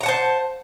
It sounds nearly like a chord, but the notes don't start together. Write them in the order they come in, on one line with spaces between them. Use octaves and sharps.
A#5 F#5 A5 C5